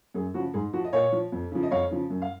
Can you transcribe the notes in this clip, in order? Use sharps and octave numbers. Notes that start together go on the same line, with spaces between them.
F#2 G#4
C#3 F3 F#4
G#2 G#4
F3 F#4
D#5
A#2 C#5 F5
F3
F2
C#3 F3
D#5
F2 C#5 F5
C#3 F3
F#2
F5